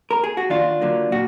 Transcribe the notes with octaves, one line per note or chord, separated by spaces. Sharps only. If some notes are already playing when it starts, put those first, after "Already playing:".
A#4
G#4
F#4
D#2 D4 F4
D3 F#3 A#3
A#2 F#4